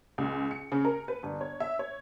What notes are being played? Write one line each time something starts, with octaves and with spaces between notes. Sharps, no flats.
C#2
C#7
C#3
A#4
B4
G1
C#5
E5
C#5